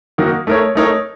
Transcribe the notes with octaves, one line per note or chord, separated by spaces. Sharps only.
D#3 A#3 D#4 F#4
A3 D#4 A#4 C#5
A3 D#4 A#4 C#5